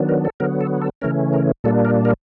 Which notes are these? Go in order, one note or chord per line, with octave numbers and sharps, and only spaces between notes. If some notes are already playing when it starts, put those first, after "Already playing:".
Already playing: D#3 F#3 B3 D4
A#4
A4
D3 F#3 B3 A#4
A4
A4
C#3 E3 A3 C#4 A#4
A#4
A#2 G3 A#3 D4 A4
A#4
A#4